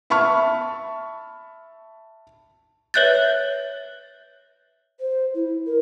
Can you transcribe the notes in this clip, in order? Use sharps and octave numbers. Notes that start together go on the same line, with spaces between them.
E5 A5 B5 C#6 F6
B4 C#5 E5 F#6 G6 A6
C5
E4
A#4